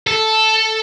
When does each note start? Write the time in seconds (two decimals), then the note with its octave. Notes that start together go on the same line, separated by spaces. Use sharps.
0.07 A4